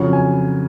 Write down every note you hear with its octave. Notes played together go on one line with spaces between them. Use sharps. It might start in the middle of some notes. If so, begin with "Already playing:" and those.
Already playing: F2 C#3 F#3
G#5